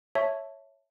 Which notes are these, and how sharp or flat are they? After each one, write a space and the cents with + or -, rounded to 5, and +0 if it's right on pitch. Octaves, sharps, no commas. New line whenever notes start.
C#5 +0 E5 +0 A5 +0